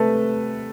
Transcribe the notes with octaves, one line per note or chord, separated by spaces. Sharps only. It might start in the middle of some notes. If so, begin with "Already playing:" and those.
Already playing: C3 A3 A4 B4